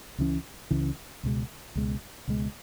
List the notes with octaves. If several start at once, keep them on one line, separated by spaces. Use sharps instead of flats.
C#2 C#3 E3 C#4
C#2 C#3 E3 C#4
C#2 B2 G#3
C#2 B2 G#3
C#2 B2 G#3